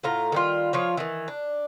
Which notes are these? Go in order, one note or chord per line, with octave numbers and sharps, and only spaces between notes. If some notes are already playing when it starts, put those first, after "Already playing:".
A2 F4 A#5
D#3 G3 F4
F3 F4 C#5
D#3 E3
D4